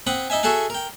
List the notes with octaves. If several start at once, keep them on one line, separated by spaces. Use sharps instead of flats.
C4 F#5 B5 D#6
D#4 D#5 E5 G#5
F#4 G#4 A4 E5 F#5 G#5
A#4 G5